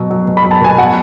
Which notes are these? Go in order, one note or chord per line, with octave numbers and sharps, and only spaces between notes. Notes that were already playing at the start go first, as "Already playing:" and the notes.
Already playing: B2 F#3
F#3
B2
B5
F#3
A5
B2 G#5
F#3 F#5